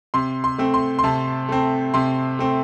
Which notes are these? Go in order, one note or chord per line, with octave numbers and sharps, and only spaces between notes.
C3 C6
C6
A3 C4
C6
C6
C3 A5
A3 C4
C3 C6
A3 C4